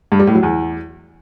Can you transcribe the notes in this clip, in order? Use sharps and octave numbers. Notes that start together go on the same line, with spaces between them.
G2
G3
A2
F#3
E2